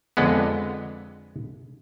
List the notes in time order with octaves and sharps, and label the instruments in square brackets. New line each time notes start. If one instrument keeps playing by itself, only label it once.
[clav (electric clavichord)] F2 D3 G#3 B3